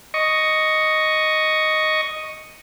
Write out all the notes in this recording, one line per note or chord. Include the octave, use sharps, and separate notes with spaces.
D#5 C#6